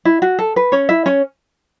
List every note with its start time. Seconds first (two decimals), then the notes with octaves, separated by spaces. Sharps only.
0.05 E4
0.22 F#4
0.39 A4
0.56 B4
0.72 C#4 C#5
0.89 E4 E5
1.06 C#4 C#5